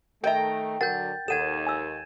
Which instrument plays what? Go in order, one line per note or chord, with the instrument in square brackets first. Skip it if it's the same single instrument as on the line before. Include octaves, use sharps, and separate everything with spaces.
[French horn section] D#3 A3 [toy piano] A#4 D#5 E5 [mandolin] G5 A#5
[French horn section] D3 F#3 [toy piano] A#4 F#5 [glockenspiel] G6 A6
[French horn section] D#2 [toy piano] A4 F#5 [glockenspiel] G#6 D#7 E7
[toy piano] G#5 E6